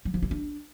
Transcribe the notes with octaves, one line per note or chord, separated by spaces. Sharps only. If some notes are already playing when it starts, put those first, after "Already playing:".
F#3
F3
E4
D4